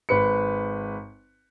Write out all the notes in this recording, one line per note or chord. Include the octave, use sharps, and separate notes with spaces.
G#1 B4 C#7